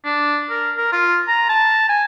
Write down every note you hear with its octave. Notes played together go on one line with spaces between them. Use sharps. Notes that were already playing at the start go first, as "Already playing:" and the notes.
D4
A#4
A#4
F4
A#5
A5
G#5